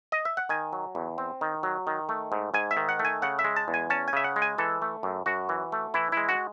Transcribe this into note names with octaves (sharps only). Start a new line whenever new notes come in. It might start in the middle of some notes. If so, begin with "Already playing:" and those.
D#5
E5
F#5
D#3 G#5
F#3
E2
C4
D#3
F#3
D#3
A3
G#2
G#2 G#5
E5
D#3
F#5
A3
G#5
C#3 F#5
E5
G#3
A5
E2
G#5
C#4 A5
G#5
C#3 E5
F#5
G#3
G#5
E3 A4
A3
F#2
F#2 F#4
E3
A3
E3 E4
G#3 E4
F#4